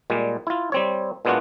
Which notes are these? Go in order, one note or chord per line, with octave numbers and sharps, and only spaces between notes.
A#2 G3 G#3
E4 F4
G3 C4 C#5
A#2 G#3 B3 D4 F4 F#4